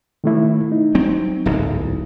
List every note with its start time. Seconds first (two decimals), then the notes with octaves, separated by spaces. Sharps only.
0.24 D#3 A3 E4
0.72 D#4
0.95 F#3 C4
1.46 D1 B1 G#2